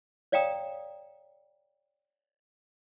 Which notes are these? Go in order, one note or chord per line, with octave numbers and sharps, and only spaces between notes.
C#5 D5 F5 G5 A#5 D#6